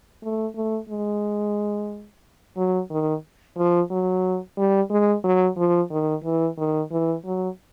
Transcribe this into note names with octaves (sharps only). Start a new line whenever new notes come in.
A3
A3
G#3
F#3
D#3
F3
F#3
G3
G#3
F#3
F3
D#3
E3
D#3
E3
F#3